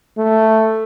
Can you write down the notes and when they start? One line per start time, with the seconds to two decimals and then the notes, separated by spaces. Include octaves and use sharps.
0.18 A3